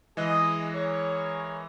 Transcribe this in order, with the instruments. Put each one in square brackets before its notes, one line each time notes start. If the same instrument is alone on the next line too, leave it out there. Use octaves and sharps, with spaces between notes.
[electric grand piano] E3 G#3 F#6 [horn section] G#4 D#5
[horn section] G#4 A#4 C#5